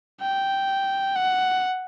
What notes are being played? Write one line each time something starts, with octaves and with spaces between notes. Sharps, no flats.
G5
F#5